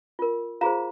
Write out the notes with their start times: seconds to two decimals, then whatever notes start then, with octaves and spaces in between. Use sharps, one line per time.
0.19 F4 A#4
0.61 F4 G#4 C5 F5 A#5